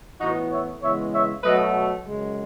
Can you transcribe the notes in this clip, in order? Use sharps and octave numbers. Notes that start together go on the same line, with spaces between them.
A2 E3 B3 D#4 F#4
C#5 E5
C#3 E3 G#3 B3 C#5 E5
C#5 E5
B2 F#3 A3 B4 D#5
F#2 C#3 G#3